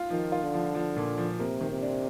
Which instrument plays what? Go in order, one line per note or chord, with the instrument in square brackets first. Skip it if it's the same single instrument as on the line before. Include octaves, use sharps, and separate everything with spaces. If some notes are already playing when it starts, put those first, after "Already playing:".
Already playing: [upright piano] F4
[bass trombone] D#3 [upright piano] F3
[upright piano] F4
[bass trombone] D3
[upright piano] F3
F3
A#2
F3
[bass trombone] C3 [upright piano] A#3
[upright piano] D#3
[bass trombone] C3
[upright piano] D4